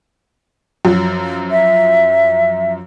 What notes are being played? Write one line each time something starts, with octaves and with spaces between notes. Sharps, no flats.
F#2 F3 F#3
E5